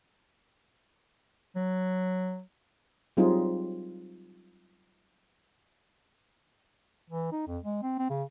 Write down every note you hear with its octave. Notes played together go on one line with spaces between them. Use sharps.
F#3
F#3 G3 C4 D#4 F4 G#4
E3
D#4
F2
G#3
C4
C4
C#3